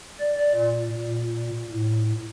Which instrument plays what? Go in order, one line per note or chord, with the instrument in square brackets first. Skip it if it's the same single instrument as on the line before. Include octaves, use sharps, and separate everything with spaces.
[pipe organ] D5
A#2
A#2
A2